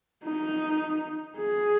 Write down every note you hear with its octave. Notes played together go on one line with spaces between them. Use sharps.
D#4
G#4